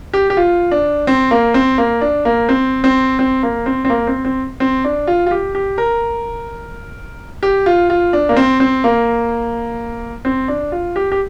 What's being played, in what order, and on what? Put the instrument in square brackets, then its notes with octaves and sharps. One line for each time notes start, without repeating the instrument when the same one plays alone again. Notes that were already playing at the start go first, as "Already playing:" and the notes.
[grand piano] G4
G4
F4
D4
C4
A#3
C4
A#3
D4
A#3
C4
C4
C4
A#3
C4
C4
A#3
C4
C4
C4
D4
F4
F4
G4
G4
A#4
G4
F4
F4
D4
A#3
C4
C4
A#3
C4
D4
F4
G4
G4